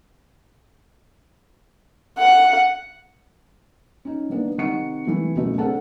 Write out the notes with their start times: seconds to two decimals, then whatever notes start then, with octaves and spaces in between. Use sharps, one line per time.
2.18 F#5
4.05 C#4 D#4
4.30 D#3 A#3 B3 D4
4.58 C3 D#3 F#5 C#6 C#7
5.07 C3 E3 A3
5.35 C#2 F#2 B2 A3
5.58 C4 D4 A4 A#4 F#5 A5